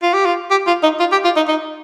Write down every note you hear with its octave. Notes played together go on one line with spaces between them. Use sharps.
F4
G4
F4
G4
F4
D#4
F4
G4
F4
D#4
D#4